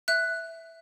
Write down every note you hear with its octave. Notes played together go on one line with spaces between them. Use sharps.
E5 F#6